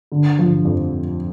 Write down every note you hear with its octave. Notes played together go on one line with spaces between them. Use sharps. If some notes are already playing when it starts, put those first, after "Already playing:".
D3
F3
F2